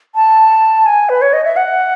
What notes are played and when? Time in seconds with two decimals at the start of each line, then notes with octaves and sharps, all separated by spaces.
0.15 A5
0.86 G#5
1.09 B4
1.22 C#5
1.33 D#5
1.45 E5
1.57 F#5